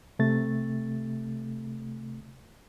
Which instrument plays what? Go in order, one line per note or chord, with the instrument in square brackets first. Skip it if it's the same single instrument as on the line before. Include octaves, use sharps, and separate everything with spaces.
[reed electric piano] C3 A3 A6